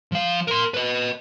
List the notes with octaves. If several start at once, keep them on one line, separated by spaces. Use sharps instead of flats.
F3 F5
A#4 C6
B4 D#5